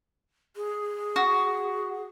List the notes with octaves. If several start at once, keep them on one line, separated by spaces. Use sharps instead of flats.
G#4
F#4